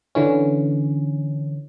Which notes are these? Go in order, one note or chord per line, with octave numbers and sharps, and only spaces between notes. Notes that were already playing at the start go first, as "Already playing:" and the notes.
D3 E3 C#4